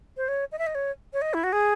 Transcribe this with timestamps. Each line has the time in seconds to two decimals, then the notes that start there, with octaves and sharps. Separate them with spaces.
0.17 C5
0.28 C#5
0.52 D#5
0.59 E5
0.67 D#5
0.75 C#5
1.13 C#5
1.22 D#5
1.34 E4
1.44 F#4
1.53 G#4